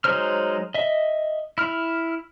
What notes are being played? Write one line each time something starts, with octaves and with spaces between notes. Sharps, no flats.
F#3 G#3 D#4 C5 F6
D#5 E5
E4 F6